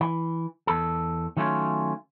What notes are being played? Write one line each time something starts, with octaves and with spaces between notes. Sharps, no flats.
E3
E2 A4
D#3 F#3 A3 B3 C#4 F4